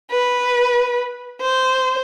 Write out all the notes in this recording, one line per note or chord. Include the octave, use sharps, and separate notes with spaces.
B4
C5